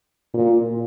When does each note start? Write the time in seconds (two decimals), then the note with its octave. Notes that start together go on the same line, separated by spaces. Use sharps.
0.34 A#2